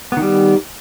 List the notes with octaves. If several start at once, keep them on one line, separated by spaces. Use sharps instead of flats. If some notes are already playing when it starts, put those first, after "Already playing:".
D#3 G3 B3